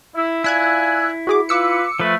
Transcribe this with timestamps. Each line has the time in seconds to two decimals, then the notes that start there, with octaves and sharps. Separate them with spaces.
0.15 E4
0.44 E4 F4 D5 G#5 E6 F#6 G#6
1.27 F#4 G#4 D6
1.49 F4 B4 D6 E6 C#7
2.00 F3 A3 B4